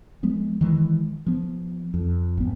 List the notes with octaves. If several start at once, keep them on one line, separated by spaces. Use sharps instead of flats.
F3 G#3 B3
D#3 E3 G#3
F3 B3
F2
G#1 B3